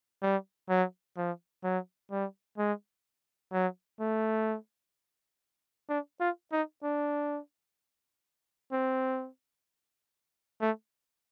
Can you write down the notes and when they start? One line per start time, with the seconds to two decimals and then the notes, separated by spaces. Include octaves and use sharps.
0.22 G3
0.69 F#3
1.17 F3
1.64 F#3
2.11 G3
2.58 G#3
3.53 F#3
4.00 A3
5.89 D4
6.20 F4
6.52 D#4
6.83 D4
8.72 C4
10.61 A3